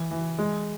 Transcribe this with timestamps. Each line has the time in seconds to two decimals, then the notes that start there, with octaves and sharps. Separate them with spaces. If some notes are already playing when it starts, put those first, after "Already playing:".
Already playing: E3
0.11 E3
0.39 G#3